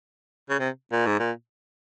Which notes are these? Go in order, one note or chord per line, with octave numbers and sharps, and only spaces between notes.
C#3
C3
A#2
G#2
A#2